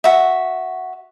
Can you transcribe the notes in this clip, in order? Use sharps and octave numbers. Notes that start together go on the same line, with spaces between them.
F#4 E5